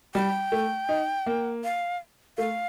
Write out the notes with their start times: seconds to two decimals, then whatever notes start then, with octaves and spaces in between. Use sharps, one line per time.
0.14 G3 G5
0.52 A3
0.89 D#4
1.26 A#3
1.64 F5
2.38 A3 F5